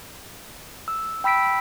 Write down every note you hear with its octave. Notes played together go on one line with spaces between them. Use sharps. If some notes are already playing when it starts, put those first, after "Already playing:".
E6
G5 B5 E6 B6 D7